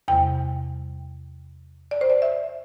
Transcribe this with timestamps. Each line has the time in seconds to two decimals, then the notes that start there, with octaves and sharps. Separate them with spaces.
0.08 E2 C3 G3 G5
1.91 D5
2.01 C5
2.10 D5
2.22 E5